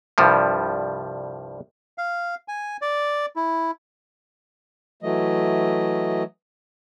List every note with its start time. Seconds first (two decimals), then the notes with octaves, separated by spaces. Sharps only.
0.18 C2 G2 F3 G3
1.98 F5
2.48 G#5
2.82 D5
3.36 E4
5.03 E3 F#3 A3 D#5